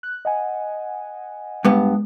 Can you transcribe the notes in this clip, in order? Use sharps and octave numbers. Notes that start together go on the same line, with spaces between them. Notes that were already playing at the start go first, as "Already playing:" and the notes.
F#6
D#5 F#5 G#5
G2 G#3 B3